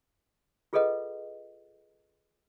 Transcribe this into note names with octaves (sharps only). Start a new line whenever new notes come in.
F4 G#4 A4 B4 D#5 F#5